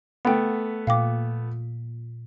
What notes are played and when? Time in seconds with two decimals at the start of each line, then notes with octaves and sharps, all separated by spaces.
0.25 A3 B3 F#5 G5
0.87 A#2 F5 G5 D6